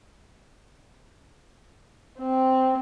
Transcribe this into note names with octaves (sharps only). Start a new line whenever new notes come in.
C4